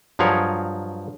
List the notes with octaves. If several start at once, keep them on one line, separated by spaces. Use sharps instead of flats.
G2 F3 F#3 G#4 A#4 C#5